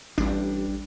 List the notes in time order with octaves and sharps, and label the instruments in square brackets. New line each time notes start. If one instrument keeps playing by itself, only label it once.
[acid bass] A1 [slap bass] G3 D4